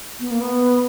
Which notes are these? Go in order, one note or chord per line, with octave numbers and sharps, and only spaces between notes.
B3
A#3
B3